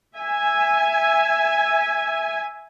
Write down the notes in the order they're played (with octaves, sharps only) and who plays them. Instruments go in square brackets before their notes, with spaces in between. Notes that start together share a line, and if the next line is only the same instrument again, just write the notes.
[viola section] E5 G#5